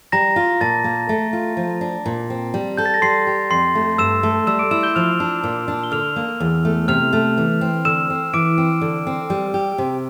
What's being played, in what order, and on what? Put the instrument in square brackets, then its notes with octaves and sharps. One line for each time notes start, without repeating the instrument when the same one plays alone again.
[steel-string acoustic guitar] G3 [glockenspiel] A#5 A#6
[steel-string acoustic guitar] F4
[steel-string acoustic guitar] A#2 [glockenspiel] A5 A6
[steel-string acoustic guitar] A#3
A3
F4
F3
D4
A#2
C4
G3
[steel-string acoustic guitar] A4 [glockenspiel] G6
[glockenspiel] A6
A#6
[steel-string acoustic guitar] G3 [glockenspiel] C6 C7
[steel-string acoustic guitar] G4
[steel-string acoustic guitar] F2 [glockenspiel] C6 C7
[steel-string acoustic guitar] A3
[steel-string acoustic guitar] G2 [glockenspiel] E6 E7
[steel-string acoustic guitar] A3
[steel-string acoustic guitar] G3 [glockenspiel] E6 E7
[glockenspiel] D6 D7
[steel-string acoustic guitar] E4 [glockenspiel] E6 E7
[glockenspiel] G6 G7
[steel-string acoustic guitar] F3 [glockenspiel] F6 F7
[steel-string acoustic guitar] D4
A#2
D4
[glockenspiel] G7
[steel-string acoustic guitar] D3 [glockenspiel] F6 F7
[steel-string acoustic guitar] A#3
E2
A3
[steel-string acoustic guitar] C3 [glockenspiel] F6 F7
[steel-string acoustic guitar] A3
E3
C4
[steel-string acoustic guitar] D3 [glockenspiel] E6 E7
[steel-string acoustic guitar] C4
[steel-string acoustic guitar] E3 [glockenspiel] D6 D7
[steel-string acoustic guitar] C4
D3
C4
G3
G4
C3